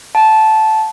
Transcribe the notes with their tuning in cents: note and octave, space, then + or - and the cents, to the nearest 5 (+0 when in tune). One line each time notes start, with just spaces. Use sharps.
F#5 -30 A5 -10